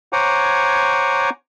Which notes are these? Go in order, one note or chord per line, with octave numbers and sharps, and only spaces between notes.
C5 C#5 F#5 G#5 A#5 D6